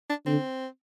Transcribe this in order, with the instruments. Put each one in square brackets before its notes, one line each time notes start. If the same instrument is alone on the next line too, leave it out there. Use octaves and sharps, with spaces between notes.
[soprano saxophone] D4
[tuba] D3 [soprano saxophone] C4